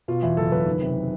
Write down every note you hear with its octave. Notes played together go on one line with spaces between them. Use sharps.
B2 F4
E2 E4
F#1 A4
F#1 B4
D#3
C3